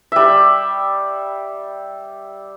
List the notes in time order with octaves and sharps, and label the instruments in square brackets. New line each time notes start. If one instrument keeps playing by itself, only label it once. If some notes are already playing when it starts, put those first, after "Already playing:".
[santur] G3 E5